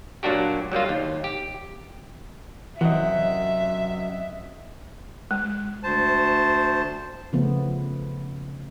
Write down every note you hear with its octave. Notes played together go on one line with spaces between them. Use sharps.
A#2 F#3 A#3 D4 F#4 G4
F#3 G3 A#3 F4
D#2
G4
F#2 C3 E3 D#5 E5 F#5
G#3
D2 C5 A5
C#3 F3 A3 B3